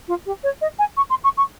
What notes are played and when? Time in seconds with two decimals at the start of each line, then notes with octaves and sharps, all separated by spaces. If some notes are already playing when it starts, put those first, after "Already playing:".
0.08 F4
0.26 G4
0.44 C#5
0.61 D#5
0.79 G#5
0.97 C#6
1.10 C6
1.24 C#6
1.37 C#6